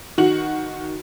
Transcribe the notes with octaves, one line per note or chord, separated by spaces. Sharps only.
D#3 F#4 F#7